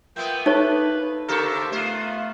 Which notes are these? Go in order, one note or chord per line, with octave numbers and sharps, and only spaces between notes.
A#3 B3 F4 E5 G5
A3 D#4 B4 C#5
C#3 A#3 G4 A4 A#4 C5 C#6
A3 B3 F4 C5